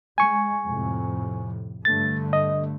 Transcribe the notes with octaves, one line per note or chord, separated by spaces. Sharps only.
G#3 G#5 C#6
F2 A2 C3
G2 D3 A3 A6
D#5